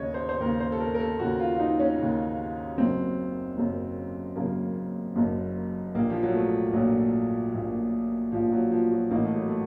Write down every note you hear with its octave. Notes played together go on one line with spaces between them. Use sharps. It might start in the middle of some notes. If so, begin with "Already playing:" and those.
Already playing: D#2 C#3 C#5 D#5
C5
C5
D#2 C#3 A#4
C5
A4
A#4
A#4
A4
D#2 C#3 F#4
F4
F4
D#4
C#4
D#2 C#3
F#1 F#2 C#3 C4
F#1 F#2 C#3
F#1 F#2 C#3 A#3
F#1 F#2 C#3
A#1 A#2 A#3
F3
F#3
A3
A#1 A#2 F#3
A#1 A#2
A#1 A#2 F3
F#3
F3
F#3
A1 A2 A#3
A3
F#3
A3